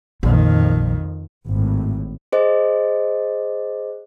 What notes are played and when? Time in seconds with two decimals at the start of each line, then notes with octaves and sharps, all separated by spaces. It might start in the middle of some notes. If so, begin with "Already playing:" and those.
0.23 A#1 F2 D#3
1.48 G#1 A2
2.32 G#4 C5 D#5